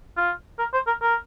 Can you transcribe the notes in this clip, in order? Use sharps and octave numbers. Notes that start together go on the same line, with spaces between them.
F4
A#4
C5
A#4
A#4